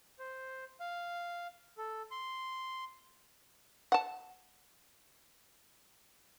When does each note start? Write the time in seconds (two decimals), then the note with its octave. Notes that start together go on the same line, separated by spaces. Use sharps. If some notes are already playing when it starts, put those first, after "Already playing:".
0.19 C5
0.80 F5
1.78 A4
2.11 C6
3.92 F#5 A5